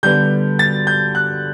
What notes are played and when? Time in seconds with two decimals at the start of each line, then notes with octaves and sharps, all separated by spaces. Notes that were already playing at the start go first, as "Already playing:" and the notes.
0.03 D3 G3 B3 G6
0.59 A6
0.87 G6
1.15 F#6